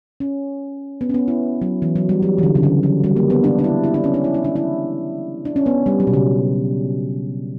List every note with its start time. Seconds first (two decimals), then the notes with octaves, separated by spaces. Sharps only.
0.20 C#4
1.01 B3
1.09 C#4
1.14 B3
1.28 E4
1.62 F#3
1.82 E3
1.96 F#3
2.09 G3
2.23 F#3
2.38 E3
2.43 D3
2.55 C#3
2.63 D3
2.83 F#3
3.04 G3
3.16 A#3
3.30 B3
3.44 D4
3.59 D4
3.64 E4
3.84 E4
3.94 D4
4.04 C#4
4.14 D4
4.24 E4
4.34 E4
4.44 D4
4.56 E4
5.45 D4
5.56 C#4
5.66 B3
5.86 G3
6.00 F#3
6.07 B2
6.13 C#3